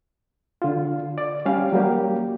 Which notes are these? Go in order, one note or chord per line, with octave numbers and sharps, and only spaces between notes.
D3 F4
D5
G3 C#4 G4 F5
F#3 G3 A#3 G4